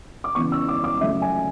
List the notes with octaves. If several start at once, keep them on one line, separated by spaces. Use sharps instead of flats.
D6
C#3 E3 B3 C#6
E6
D6
D6
C#3 F#3 A3 E5
G#5